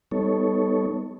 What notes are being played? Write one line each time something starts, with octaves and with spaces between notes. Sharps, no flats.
G3 B3 D#4 A4 C#5